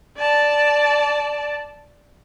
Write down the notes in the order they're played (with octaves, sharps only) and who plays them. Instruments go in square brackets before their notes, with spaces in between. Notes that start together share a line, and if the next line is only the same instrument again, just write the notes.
[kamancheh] D5 A5